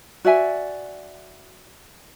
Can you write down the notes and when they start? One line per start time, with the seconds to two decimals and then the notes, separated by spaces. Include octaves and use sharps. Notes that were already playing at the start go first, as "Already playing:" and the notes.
0.25 F#4 D5 E5 G#5